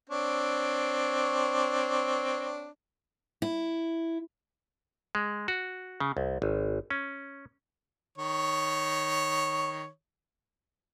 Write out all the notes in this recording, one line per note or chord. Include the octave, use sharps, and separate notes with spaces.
C4 D4 C#5
E4
G#3
F#4
C#3
C2
G#1
C#4
D#3 C#5